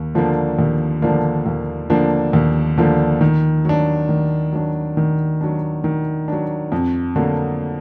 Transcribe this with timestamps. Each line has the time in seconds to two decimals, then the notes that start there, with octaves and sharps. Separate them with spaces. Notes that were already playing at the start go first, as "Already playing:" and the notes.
Already playing: D#2
0.15 D3 F3 A#3 D4
0.59 D#2
1.02 D3 F3 A#3 D4
1.46 D#2
1.90 D3 F3 A#3 D4
2.33 D#2
2.78 D3 F3 A#3 D4
3.21 D#3
3.65 F#3 D4
4.09 D#3
4.53 F#3 D4
4.97 D#3
5.41 F#3 D4
5.84 D#3
6.28 F#3 D4
6.72 F2
7.16 D3 F#3 A#3